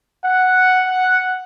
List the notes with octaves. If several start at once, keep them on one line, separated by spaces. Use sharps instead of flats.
F#5
F#5